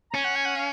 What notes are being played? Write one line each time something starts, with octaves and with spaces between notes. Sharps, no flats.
A#5
C#4 G#5
F#5
G#5
F#5
F5